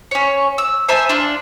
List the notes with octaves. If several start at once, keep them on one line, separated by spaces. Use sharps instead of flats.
C#4 C#5
E6
C5 E5 G#5 A5
D4 F4